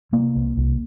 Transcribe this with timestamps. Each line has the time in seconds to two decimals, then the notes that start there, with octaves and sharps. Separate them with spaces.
0.12 C3 A#3
0.35 C2
0.57 C2